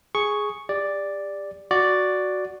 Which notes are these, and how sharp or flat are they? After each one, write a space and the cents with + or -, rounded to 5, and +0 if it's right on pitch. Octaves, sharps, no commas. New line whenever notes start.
G#4 +0 C#6 +0
G4 +40 D5 +0
F#4 +0 D5 +0